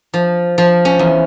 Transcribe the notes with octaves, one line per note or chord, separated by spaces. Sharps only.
F3
F3
C#4
E2